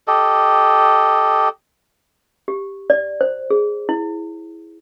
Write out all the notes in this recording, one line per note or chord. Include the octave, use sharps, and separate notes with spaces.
G4 A4 D#5
G4
D5
C5
G#4
E4